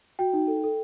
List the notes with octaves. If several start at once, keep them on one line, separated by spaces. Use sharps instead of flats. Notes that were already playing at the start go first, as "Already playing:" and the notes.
F#4 G5
D#4
A4
A4